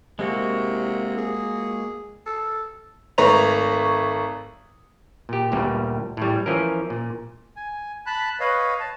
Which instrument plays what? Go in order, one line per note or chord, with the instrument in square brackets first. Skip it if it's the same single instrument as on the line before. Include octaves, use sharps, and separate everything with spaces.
[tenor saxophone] C3 [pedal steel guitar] G#3 A#3 F#4
[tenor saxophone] G#4
A4
[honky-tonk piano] G#1 A3 B4 C#5 A#5 F7
[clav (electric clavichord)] A#2 G4
G1 D2 G2 A#2 G3
A2 G3
E3 F3 C#4 A#4
A#2
[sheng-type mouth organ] G#5
A5 B5 F#6
B4 C#5 D#5 F5
A5